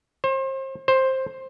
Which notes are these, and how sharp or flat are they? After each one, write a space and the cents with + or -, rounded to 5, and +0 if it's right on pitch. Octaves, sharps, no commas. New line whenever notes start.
C5 +35
C5 +10